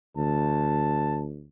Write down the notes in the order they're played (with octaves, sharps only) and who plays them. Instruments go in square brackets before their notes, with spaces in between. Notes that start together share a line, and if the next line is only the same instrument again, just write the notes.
[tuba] D2 [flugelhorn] A5